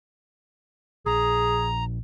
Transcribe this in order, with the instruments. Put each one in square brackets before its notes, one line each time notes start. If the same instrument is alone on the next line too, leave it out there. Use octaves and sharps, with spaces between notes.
[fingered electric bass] A#1 [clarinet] G#4 [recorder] A#5